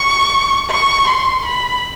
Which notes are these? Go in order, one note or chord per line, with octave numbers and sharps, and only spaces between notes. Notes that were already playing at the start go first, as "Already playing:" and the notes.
Already playing: C#6
C#6
C6
B5